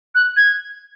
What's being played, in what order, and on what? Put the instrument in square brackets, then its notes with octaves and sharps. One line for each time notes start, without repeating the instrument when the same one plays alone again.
[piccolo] F#6
G#6